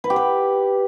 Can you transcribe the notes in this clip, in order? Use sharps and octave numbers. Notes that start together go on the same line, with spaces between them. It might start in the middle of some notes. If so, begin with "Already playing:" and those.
B4
G4
B4